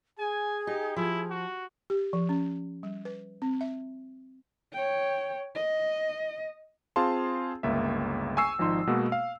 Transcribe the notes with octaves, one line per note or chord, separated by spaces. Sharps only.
G#4 G#5
D#4 G4
F3 E4
F#4
G4
F3
C#4
G3
B4
C4
E5
C#5 G5
D#5
C4 F4 G#4 F5 A5 C6
G1 C#2 A#3 E5
G#5 C#6 E6 C7
G#1 F3 D#4 C6
B2 G#3 A#3 B3 F#4
F5